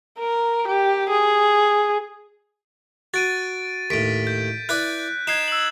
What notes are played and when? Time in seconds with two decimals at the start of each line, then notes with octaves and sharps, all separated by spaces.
0.20 A#4
0.68 G4
1.10 G#4
3.14 F#4 A6 D7 D#7
3.90 D#2 A2 B6 D7
4.27 G6
4.69 E4 B4 D5 F#6
5.27 D#4 G#6 C7 E7
5.48 E6 F#7